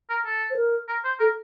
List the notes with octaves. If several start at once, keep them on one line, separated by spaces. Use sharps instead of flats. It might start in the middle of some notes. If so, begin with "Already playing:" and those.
A#4
A4
C5
A#4
A#4
C5
A4 A#4